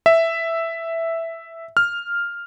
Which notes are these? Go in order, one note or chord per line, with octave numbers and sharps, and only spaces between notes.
E5
F6